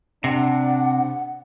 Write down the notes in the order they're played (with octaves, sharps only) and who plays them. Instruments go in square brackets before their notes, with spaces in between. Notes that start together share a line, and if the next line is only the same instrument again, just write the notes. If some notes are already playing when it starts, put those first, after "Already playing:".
[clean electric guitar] C3 [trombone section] D4 [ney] F#5